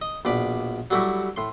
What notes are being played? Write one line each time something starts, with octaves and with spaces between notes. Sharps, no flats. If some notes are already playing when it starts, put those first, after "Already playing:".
D#5
A#1 B2 D5 B5
F#3 G3 A3 E4 F#4 G4
A2 C6